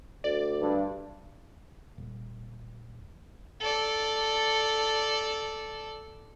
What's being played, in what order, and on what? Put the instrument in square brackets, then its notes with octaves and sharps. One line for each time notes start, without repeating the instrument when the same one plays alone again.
[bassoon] D2 [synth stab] D5
[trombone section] G2
[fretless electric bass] D#1
[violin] A4 D5